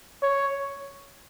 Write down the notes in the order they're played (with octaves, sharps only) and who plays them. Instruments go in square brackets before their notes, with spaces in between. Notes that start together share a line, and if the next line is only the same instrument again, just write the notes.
[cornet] C#5